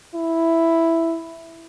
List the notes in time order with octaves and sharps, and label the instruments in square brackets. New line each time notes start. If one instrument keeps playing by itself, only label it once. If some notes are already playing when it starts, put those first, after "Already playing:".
[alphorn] E4